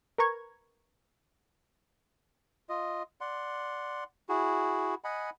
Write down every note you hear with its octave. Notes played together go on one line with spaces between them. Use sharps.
A#4 B4 A#5 C#6 G#6
F4 D#5
D5 F#5 C6
E4 F#4 G#4
D#5 F#5 G#5 B5